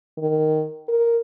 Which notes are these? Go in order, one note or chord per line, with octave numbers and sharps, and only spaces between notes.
D#3
A#4